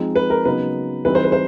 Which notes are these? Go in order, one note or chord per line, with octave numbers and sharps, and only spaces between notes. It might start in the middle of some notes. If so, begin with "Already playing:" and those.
Already playing: F3 G#3 C4 D#4
B4
A#4
C#3 F#3 B3 D#4 B4
E3 G3 C4 D#4 B4
C5
B4
C5